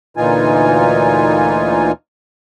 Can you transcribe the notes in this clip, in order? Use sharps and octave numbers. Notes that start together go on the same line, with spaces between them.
D2 A#2 E3 D#4 F4 G#5